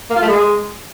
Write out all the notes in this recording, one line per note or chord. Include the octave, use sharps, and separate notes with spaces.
A#3
F4
A3
G#3